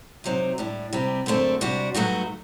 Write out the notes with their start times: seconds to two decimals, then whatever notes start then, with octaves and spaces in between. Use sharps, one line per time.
0.24 C3 F#3 C4 D#4
0.58 A2 G3 D4
0.93 C3 G3 C4
1.26 F#2 D3 A3 C4
1.61 C3 G3 D4 F#4
1.95 G2 F#3 A3 D#4 F#4